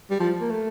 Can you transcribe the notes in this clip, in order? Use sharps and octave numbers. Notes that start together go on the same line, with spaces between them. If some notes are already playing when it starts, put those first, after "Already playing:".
G3
F3
A#3
A3